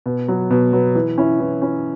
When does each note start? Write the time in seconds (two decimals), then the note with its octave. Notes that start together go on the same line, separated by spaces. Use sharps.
0.06 B2
0.28 F#3 B3
0.51 B2
0.73 F#3 B3
0.95 E3
1.18 C#4 E4
1.40 E3
1.62 C#4 E4